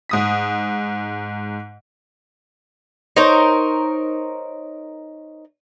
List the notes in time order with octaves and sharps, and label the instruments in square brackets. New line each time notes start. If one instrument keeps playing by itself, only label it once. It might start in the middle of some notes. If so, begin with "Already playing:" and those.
[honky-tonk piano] G#2 D#6 B6
[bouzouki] D#4 A#4 C5 C#5